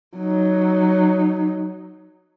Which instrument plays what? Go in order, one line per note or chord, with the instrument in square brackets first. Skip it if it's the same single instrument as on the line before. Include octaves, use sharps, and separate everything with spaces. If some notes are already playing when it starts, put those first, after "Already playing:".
[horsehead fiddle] F#3 D#4